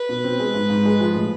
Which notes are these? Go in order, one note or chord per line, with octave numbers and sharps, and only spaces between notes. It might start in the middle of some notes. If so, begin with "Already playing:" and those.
Already playing: B4
B2
C4
G#3
G#2
G#2
G#3
F3
A2